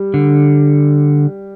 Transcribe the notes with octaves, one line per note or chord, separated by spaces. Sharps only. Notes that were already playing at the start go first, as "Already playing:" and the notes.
Already playing: G3
D3